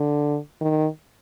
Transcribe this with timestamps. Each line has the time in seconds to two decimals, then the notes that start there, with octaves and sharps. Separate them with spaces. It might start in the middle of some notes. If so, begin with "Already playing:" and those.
Already playing: D3
0.61 D#3